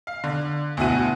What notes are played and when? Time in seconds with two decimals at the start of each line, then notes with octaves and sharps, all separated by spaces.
0.07 F5
0.24 D3
0.77 D2 B2 E4 F#4 D#7